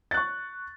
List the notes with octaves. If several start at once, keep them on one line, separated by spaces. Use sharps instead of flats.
C#6 F#6 A6